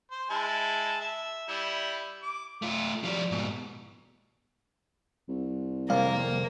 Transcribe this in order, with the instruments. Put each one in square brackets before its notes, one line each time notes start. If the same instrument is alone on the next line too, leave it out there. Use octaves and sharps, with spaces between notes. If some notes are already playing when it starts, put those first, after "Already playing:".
[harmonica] C5
G#3 E4 A5
E5
G3 E4
D6
[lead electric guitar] A3 F4
F3 G3
G#2 B2
[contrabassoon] C2
[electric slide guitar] F2 C3 G3 [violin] A#3 [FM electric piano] F5